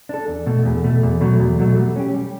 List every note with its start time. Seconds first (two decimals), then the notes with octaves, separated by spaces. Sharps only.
0.09 D4 A4
0.28 E2
0.46 B2 A3
0.65 E2
0.84 B2 A3
1.03 E2
1.21 B2 F#3 A3
1.40 E2
1.58 B2 F#3 A3
1.77 G3
1.96 C#4 G4
2.14 G3